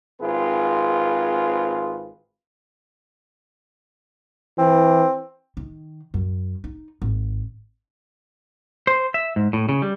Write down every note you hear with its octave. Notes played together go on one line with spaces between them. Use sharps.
G#1 C4 F4 G#4 B4
E3 C4
D#3
F#2
D#4
G#1
C5
E5
G#2
A2
C#3
G3